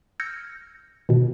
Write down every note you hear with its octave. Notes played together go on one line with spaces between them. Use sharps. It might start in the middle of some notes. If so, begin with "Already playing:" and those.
E6 F6 G6 G#6 A#6 C#7
B2 D#3